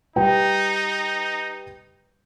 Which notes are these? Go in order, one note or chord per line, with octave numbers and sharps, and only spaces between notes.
G3 D#4 B4 G5